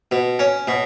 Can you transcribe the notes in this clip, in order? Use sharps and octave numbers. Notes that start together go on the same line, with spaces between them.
B2
C#4
B2